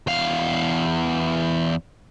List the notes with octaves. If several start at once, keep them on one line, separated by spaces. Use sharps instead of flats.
E2 F5